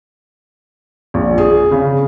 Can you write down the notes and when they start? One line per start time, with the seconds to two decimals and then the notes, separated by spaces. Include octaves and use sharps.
1.14 A#1
1.38 G#4
1.71 C#3